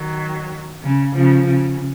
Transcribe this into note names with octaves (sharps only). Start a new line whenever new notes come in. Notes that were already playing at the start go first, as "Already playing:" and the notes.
Already playing: D#3 F#3
C#3
C#3 F3
C#3